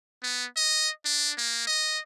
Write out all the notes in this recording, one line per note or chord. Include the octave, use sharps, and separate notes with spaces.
B3
D#5
D4
A#3
D#5